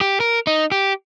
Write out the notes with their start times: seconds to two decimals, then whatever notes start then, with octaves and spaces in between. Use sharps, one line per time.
0.01 G4
0.20 A#4
0.47 D#4
0.72 G4